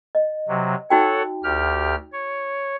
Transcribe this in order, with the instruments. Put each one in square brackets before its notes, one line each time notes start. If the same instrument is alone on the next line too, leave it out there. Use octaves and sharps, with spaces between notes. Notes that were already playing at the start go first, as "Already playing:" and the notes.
[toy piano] D#5
[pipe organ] C3 F#3
[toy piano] D#4 F#4 G5 [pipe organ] A4 C#5 F#5
[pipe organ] D2 G4 F6
C#5